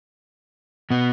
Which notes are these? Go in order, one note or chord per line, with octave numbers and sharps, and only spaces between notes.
B2 B3